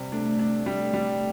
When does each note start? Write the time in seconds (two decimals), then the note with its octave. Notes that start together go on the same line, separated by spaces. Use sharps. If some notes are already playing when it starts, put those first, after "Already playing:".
Already playing: C3 G3
0.12 A3 D4
0.39 D4
0.66 G3
0.94 G3